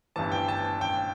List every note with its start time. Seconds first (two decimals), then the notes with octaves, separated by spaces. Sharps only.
0.16 G1 G2 E3 A5
0.32 G5
0.48 A5
0.81 G5